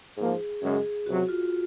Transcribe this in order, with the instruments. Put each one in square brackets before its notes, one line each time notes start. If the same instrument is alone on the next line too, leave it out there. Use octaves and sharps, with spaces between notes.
[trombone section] G#2 F3 A#3 [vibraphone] G#4
[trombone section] F#2 C#3 G#3 C#4 [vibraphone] G#4
[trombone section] C#2 C3 F#3 [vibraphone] F#4
[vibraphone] F4